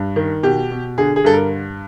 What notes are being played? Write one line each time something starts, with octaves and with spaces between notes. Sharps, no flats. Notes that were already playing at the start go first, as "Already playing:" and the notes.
Already playing: G2
D#3
B2 G4
B2
D3 G#4
G#4
G2 A4
A#4